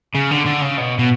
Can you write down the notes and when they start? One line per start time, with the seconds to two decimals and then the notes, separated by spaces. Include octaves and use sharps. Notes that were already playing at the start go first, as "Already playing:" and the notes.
0.15 C#3
0.31 D3
0.46 D3
0.62 C#3
0.78 B2
0.99 B2